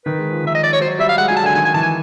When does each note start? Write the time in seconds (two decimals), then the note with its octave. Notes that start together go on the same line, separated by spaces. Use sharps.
0.05 D#3 B4
0.19 G#3
0.31 F3
0.44 D#3 E5
0.55 D#5
0.63 D5
0.73 C#5
0.81 F#3 C5
0.99 G3 E5
1.09 F5
1.18 G#3 F#5
1.28 F#3 G#5
1.36 A5
1.43 D3 G#5
1.55 D#3 G#5
1.65 G#5
1.74 E3 A5
1.83 G#5